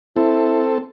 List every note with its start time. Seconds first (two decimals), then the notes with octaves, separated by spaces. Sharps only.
0.16 C4 E4 A4